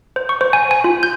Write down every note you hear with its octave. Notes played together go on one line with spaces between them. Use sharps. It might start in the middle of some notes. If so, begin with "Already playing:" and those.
C5
C#6
C5
G#5
G#5
F4
G6